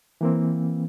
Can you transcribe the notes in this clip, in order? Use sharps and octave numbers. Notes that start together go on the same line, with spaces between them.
E3 A#3 C4